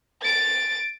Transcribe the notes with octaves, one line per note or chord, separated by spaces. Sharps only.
A6 D7